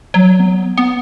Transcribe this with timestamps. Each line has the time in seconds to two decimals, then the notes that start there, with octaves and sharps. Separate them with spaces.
0.14 F#3
0.40 B3
0.78 B3